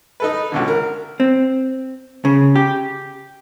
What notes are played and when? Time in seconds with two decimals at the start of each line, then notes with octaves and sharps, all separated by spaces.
0.20 D#4 A4 B4
0.52 C#2 B2 D3
0.68 A#4
1.20 C4
2.25 C#3
2.56 G4